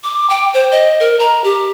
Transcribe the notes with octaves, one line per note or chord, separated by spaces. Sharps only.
D6
G5
C5
D#5
A#4
A#5
G4